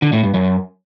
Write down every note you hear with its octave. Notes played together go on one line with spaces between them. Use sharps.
D3
A2
G2
F#2